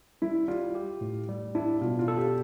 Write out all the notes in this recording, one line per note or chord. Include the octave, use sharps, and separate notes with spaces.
G3 E4
G3 F4
G4
A2
G3
D4 E4
B2 F4
F4
A4
G4